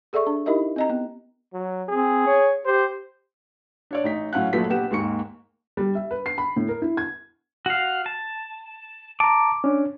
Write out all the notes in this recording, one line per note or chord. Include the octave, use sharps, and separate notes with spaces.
G#4 A4 D5 E5 C#6
D4
D#4 E4 G4 A#4 D#5 E5
C4 D#5 A#5
B3
F#3
C4 G#4
C#5
G4 C5
D4 C#5 D5
A1 D#4 B6
A2 F#3 C#4 F5 F#5 F#6
A#1 F3 F#3 A3 B4 B6
A#1 B3 G4 F#5 E7
D#2 G#2 A#3 C#6 C#7
G3
E5
B4
C7
B5
A2
A#4
E4
G#6
F#4 F5
A5
A5 A#5 D6
C#4 D4